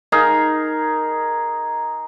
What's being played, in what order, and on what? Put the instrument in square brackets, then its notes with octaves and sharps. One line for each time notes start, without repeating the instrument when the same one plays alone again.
[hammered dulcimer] D#4 G#4 A#4